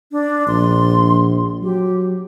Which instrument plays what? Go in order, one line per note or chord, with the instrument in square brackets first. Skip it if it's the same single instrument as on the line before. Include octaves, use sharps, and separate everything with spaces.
[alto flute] D4
[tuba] A#1 [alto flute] C6
[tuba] F#3 [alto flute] G4